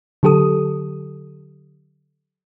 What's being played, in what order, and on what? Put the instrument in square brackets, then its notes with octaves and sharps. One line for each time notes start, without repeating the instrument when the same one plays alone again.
[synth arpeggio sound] D3 F#3 G4 A4 D#6